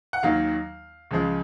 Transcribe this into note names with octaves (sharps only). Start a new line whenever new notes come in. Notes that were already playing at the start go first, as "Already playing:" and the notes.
F#5
D#2 D#3 F#3 F5
C#2 C#3 F3 G#3